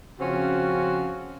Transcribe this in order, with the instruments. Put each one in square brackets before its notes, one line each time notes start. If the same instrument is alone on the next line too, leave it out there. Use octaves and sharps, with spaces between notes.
[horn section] C#3 F3 C4 C#4 F4 F#4